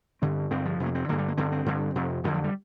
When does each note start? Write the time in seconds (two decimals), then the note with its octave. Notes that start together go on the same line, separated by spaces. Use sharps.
0.22 G2 D3 C4
0.51 G2 D3 C4
0.65 F3
0.80 F2 C3
0.86 A#3
0.95 C4
1.09 G2 D3 A#3
1.18 G3
1.28 A#3
1.37 G2 D3 C4
1.52 C4
1.66 G2 D3
1.95 F2 C3
2.24 F2 D3 F3
2.34 F3
2.44 G3